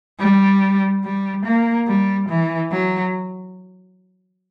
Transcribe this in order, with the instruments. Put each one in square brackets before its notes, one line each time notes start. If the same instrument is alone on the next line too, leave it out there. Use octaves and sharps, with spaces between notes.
[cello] G3
G3
A#3
G3
E3
F#3